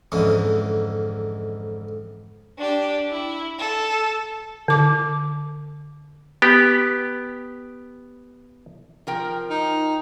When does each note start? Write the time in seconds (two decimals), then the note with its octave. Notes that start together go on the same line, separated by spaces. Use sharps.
0.12 F2 G#2 D3 E3 C#4
2.58 D4 G4
3.10 E4
3.59 A4
4.68 D3 D6
6.42 B3 G4
9.07 F3 A#4 G5
9.50 D#4